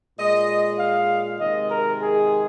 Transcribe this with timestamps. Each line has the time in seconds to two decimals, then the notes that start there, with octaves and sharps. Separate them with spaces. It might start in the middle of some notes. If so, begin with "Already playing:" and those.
0.17 A#2 G#3 D#5
0.79 F5
1.40 C3 D#3 G#3 D#5
1.70 A#4
2.02 G#4